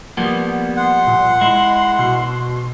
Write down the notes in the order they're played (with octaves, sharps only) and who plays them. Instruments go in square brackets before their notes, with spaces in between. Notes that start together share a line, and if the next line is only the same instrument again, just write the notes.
[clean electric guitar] F3 G3 A#3 [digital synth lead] B3
[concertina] F#5 [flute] C6
[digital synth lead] A#2
[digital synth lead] G#3 [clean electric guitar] E4
[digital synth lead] B2